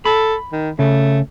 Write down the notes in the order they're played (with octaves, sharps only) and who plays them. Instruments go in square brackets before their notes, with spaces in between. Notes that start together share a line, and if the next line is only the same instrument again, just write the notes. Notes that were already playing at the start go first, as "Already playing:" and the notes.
[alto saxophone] A4 [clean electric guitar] B5
[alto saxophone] D#3
[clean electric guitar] C#3 [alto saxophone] A3